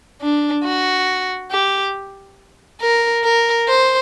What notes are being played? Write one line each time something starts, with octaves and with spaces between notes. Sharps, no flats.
D4
F#4
G4
A#4
A#4
C5